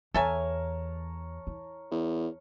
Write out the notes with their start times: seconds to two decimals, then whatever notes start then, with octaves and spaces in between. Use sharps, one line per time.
0.14 E2 A4 A#4 C#5 E5 G#5 A5
1.47 E4
1.91 E2